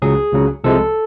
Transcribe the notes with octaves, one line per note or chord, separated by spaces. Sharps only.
C#2 C#3 F#3 G#4
C#2 C#3 F#3
C2 C3 F3 G#3 A4